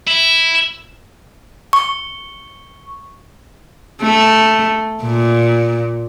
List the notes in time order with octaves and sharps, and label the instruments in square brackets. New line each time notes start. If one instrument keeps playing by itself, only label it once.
[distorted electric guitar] E4
[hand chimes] C#6
[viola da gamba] A3
A#2